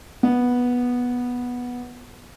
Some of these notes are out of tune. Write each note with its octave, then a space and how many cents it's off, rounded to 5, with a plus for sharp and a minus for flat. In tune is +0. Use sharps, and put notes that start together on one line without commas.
B3 -10